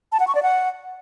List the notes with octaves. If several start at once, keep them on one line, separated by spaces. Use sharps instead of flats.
A5
F#5
C#6
D5
F#5